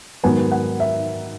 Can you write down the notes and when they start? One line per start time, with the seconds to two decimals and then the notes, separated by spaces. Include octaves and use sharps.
0.24 G#2 D#3 F#3 B3 G#5
0.52 F#5
0.80 E5